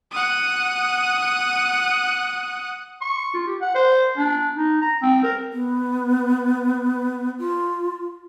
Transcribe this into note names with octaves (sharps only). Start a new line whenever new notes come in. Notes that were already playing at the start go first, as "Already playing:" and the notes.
F#5 D#6
C#6
F4
G4
F#5
C5
D4
D#4
A#5
C4
A#4
B3
F4